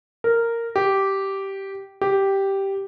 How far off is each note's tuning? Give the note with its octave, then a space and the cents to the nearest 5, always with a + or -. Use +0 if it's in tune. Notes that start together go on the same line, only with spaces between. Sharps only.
A#4 -10
G4 -10
G4 -5